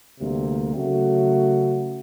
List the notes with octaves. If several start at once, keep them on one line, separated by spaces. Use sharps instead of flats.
D2 C3 G3 A#3
C#3 F#3 A3 F#4